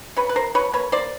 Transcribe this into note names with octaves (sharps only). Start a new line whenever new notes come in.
C3 B4 C#5
B4
F3 A#4 C5
F3 B4 C#5
A#3 B4 C#5
A#3 C5 D5